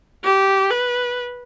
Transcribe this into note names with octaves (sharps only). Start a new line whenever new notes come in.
G4
B4